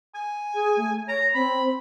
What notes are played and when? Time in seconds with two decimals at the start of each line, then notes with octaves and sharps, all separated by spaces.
0.15 G#5
0.55 G#4
0.77 A3
1.08 C#5 A#5
1.34 C4 B5